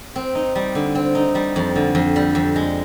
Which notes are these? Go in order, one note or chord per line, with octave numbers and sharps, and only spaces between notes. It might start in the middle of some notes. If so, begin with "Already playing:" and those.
C4
D#4
G3
D3
C4
D#4
G3
F2
D3
F2
G3
F2
G#3